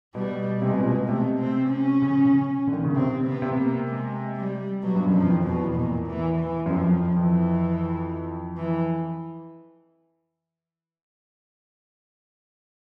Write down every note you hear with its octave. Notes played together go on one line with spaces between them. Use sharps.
B2 G3
C3 G#3
B2
A#2
B2
C3 A3
C4
C#4
C#3
C#3
D3
D#3
C#3
C3 C4
B3
C3
A#3
G#3
G3
B2 F#3
G2
F#2
F3
E2
F2
B2
E2
A#2
E3
E3
F#2
F2 F3
F2 E3
E3